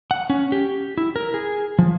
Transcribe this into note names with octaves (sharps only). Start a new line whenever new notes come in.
F#5
C#4
G4
E4
A#4
G#4
F3